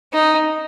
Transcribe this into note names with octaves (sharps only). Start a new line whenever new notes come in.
D#4